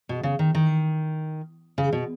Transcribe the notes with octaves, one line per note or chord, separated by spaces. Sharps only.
B2
C#3
D#3
D#3
C#3
B2